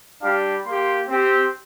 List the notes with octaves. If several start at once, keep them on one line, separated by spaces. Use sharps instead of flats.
G3 D4 G4 F5
A#3 G4 C6
C4 G4